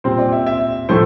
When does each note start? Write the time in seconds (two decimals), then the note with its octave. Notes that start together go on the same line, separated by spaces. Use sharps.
0.04 A#2 G3 C4 C5
0.19 D5
0.32 E5
0.47 E5
0.89 A2 F3 A3 C5